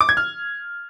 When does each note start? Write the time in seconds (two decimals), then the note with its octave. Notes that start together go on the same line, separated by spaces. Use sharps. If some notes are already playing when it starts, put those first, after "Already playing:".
0.01 D6
0.09 G#6
0.17 F6